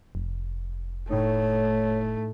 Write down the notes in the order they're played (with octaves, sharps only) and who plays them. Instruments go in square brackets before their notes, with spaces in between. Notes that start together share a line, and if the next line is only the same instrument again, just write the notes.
[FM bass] F1
[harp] A2 D#4 [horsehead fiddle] A3 [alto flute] C#5